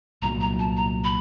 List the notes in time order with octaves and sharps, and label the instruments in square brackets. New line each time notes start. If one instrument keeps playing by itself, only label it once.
[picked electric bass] C2 A#2 F#3 [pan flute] A#5
[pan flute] A#5
A5
A#5
B5